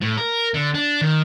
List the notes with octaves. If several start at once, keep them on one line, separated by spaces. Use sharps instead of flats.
A2
A#4
D3
D4
D#3